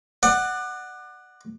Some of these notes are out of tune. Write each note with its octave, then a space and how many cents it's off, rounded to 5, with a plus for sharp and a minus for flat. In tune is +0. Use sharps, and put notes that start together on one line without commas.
D5 +35 F#5 +0